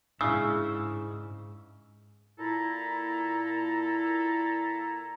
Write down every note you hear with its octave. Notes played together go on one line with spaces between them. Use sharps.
G#2 C#3 D4 E4 G#4 E6
A#2 E4 A4 A#5